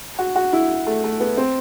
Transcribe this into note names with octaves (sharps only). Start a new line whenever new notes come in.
F#4
F#4
E4
A3
A3
B3
C4